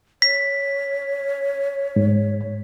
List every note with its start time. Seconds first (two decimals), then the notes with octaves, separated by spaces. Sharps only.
0.22 C#5 B6
1.96 G#2